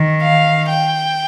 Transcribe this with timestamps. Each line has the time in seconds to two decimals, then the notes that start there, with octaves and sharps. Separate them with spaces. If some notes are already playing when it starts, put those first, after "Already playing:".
Already playing: D#3
0.22 F5
0.69 G5